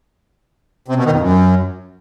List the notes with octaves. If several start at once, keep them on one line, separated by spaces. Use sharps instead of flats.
C3
B2
D#3
F2
F#2